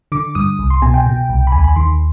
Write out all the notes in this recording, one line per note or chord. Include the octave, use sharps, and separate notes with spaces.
D3 D6
G2 D#6
C2
C6
B2 G#5
G5
B2
C2
B5
D#2 G#5
B5
D#3 C6